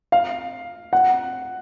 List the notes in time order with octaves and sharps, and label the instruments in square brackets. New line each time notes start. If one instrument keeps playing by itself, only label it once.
[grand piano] F5
F#5